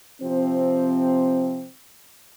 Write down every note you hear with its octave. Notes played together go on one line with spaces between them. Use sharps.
C3 F3 C4